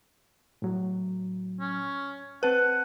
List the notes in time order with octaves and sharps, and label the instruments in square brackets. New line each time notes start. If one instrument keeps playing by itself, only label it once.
[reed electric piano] A2 F#3
[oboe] C#4
[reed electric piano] C4 A5 F#6 [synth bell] B4 [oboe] F#5